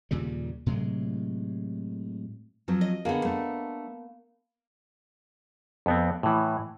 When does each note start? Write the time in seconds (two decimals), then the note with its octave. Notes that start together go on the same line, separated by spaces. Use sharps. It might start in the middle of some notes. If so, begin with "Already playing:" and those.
0.11 D#2 A#2 C#3 G3
0.66 A2 C3 F#3 G#3
2.68 F3 F#3 C4
2.81 D#5
3.05 D3 A#3 B3 G#4
3.25 A3 D4
5.86 F2 B3 C4
6.23 A2 E3